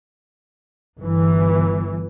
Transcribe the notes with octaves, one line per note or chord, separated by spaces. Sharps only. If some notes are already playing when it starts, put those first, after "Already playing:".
G1 E3